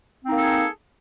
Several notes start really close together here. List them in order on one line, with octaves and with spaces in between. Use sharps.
C4 D#4 A#3 A4 G#4